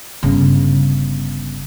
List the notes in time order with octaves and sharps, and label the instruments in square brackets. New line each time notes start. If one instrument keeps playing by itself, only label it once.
[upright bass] G1 C#3